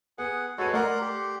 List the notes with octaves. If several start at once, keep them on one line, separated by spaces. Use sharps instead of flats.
B3 G#4 F#5
G#3 F#4 A4 B4 C#5
A3 A#4 D5 F#5 A#5 C6
G4